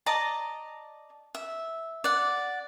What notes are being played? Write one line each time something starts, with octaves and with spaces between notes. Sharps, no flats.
D5 D#5 A5 A#5
E5
D5 F#5